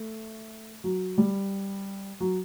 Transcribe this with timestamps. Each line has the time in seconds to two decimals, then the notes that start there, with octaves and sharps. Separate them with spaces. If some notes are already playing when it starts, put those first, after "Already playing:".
Already playing: A3
0.84 F#3
1.18 G3
2.20 F#3